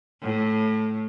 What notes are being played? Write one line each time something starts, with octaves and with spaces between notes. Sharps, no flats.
A2